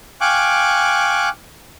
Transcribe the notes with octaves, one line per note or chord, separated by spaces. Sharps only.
F5 G5 G#5 C#6 D6 F#6